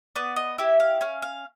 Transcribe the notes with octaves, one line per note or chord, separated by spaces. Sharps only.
B3 D5
D#5
E4 G4 E5
F5
C#4 F5
F5